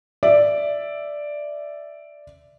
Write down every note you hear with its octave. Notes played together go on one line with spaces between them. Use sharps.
D5 E5